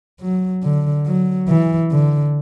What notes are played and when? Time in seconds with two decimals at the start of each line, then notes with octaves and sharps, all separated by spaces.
0.21 F#3
0.63 D3
1.06 F#3
1.48 E3
1.91 D3